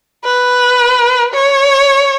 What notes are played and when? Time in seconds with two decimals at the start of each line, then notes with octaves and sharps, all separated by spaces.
0.24 B4
1.34 C#5